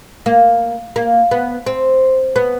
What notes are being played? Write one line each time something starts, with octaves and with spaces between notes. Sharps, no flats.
A#3
A#3
B3
C4
B3